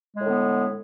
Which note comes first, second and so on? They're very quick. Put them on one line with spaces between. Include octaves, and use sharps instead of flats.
G#3 A2 D3 B3